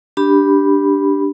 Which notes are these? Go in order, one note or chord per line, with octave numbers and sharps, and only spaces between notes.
D4 G4 B5